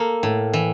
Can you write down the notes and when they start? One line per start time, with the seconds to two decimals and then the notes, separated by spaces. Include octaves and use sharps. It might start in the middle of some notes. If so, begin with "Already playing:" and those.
Already playing: A#3 A4
0.23 A2
0.53 E3